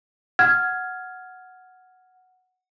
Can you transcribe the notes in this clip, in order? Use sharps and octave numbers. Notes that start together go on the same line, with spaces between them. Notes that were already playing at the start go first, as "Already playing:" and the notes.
F#5 F6 G#6